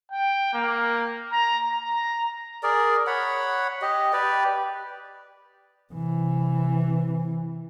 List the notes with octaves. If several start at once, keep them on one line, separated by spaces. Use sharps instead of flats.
G5
A#3
A#5
A#5
G#4 A#4 D5
C#5 F#5 B5
G4 D#5
G4 B4 D5
C3 E3